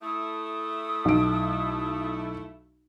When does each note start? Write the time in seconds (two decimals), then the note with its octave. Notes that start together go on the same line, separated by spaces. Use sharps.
0.03 A3 E4 D#6
1.05 B1 D7